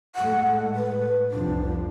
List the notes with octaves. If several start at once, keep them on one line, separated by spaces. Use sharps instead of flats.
A2 G#3 A3 F#5
B4
F1 C2 F3 D4